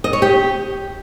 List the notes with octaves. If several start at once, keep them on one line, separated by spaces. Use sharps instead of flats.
D#5
C#5
G4